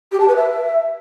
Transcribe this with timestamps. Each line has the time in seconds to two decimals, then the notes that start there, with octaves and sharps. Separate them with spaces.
0.12 G4
0.20 A5
0.28 B4
0.36 E5